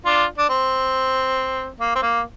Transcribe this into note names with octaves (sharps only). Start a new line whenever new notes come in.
D4 F4
D4
C4
A#3
C4
A#3